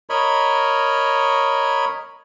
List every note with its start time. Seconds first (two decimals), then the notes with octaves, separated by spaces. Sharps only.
0.10 A#4 C#5 D#5 B5